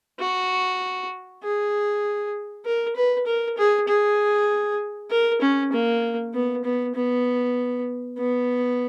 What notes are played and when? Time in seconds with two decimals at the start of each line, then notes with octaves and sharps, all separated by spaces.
0.20 F#4
1.43 G#4
2.65 A#4
2.96 B4
3.27 A#4
3.58 G#4
3.88 G#4
5.11 A#4
5.42 C#4
5.73 A#3
6.34 B3
6.64 B3
6.95 B3
8.18 B3